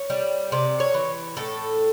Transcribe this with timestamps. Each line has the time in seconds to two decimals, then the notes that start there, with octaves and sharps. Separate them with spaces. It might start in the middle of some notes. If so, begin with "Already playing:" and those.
Already playing: C#5
0.10 G3
0.52 C3 D5
0.80 C#5
0.94 E3
1.37 A2 A4